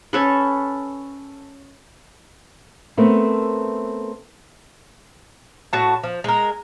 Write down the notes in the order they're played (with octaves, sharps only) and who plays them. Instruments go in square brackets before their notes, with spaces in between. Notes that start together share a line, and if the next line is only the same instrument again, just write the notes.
[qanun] C#4 A4 B4
[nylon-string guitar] A3 B3 C4 A4 A#4 E5
[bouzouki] A2 F#4 A5
F3
G#3 A#4